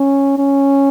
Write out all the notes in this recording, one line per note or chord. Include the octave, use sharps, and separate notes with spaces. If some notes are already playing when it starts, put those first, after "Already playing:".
Already playing: C#4
C#4